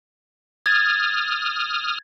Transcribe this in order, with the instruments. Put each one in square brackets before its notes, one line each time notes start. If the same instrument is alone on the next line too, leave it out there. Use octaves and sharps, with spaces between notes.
[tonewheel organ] D#6 F6 [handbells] G#6 A6